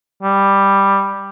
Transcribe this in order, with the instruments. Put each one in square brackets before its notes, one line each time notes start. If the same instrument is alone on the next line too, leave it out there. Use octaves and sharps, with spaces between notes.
[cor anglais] G3